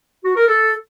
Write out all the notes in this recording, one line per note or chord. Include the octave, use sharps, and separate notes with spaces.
F#4
A#4
A4